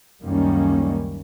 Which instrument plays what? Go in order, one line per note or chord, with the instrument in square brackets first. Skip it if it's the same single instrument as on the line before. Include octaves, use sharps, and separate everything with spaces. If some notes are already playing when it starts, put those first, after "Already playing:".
[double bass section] C#2 F#2 D#3 G3 A#3 C#4